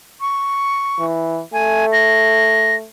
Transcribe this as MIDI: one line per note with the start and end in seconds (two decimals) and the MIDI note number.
0.21 1.05 85
0.99 1.40 52
1.53 2.86 57
1.53 1.86 80
1.93 2.75 94